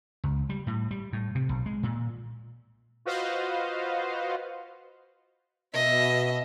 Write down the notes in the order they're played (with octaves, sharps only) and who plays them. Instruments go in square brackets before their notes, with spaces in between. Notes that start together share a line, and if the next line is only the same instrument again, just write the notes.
[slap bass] C#2
G3
A2
G3
A2
C3
B1
G#3
A#2
[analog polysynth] F4 F#4 B4 C5 D#5 F5
[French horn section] B2 [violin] D#5 E5